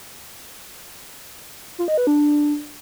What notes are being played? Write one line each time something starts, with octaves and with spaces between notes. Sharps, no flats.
F4
D#5
B4
D4